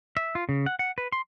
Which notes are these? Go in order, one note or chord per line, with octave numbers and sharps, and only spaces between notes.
E5
F4
C#3
F#5
F#5
B4
C6